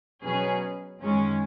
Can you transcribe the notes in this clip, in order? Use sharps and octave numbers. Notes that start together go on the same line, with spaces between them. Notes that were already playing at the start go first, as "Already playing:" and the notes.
B2 F#3 C#4 G#4 B4
F#2 D#3 G#3 C#4